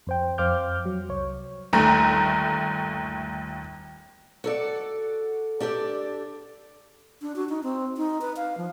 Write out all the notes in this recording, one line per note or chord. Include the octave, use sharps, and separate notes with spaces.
F2 C5 G5
F2 C5 F5 D6 F6 G6
F#3
C2 C#5
G1 D#2 A3 A#5
F#4 A4 D5
D4 G4 A4 D5
D4
F#4
D#4
C4
D#4
B4
F5
F3